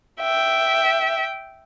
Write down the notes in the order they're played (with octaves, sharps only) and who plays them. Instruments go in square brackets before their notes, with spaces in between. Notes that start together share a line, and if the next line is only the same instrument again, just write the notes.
[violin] E5 G5